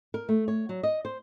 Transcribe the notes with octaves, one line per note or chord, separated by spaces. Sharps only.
A#4
A3
C#5
F#3
D#5
C5